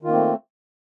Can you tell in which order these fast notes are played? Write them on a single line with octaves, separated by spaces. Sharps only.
D#3 F4 A#3 C4 A3